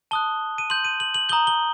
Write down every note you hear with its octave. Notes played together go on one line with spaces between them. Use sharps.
A5 D#6 F#6 G7
D#7
C6 G6 F#7
D#7
F#7
F#7
A#5 D#6 G6 G7
G7